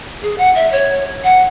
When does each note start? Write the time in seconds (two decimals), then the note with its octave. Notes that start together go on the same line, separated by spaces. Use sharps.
0.22 G#4
0.38 F#5
0.55 E5
0.72 C#5
1.24 F#5